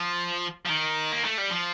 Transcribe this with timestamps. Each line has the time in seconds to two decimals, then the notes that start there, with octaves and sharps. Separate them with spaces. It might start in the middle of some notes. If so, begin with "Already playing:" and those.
Already playing: F3
0.66 F3
0.69 D#3
1.12 A#3
1.24 A3
1.38 G3
1.50 F3